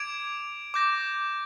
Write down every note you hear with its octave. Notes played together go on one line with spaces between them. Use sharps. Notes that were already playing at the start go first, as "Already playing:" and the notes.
Already playing: D6 G#6 D7 F7
D6 G6 A#6